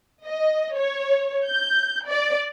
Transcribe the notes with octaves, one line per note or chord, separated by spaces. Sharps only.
D#5
C#5
G6
D5